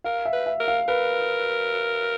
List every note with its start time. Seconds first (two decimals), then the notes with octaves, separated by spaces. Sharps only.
0.04 A#4 F5
0.25 E5
0.33 B4
0.46 E5
0.60 A#4
0.68 F5
0.88 A#4 B4